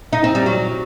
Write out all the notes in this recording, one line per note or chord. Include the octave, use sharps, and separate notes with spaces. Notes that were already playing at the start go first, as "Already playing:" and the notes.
D#4
C4
G3
F#3